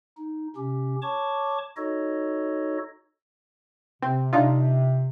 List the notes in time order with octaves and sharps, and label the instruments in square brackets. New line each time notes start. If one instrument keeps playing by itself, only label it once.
[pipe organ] D#4
C3 C#4 G4
C#5 A5 C#6 D6
D#4 F#4 A4 C#5 D#5
[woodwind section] C3 [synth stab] C4
[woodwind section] C3 [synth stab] D4 D#4 F4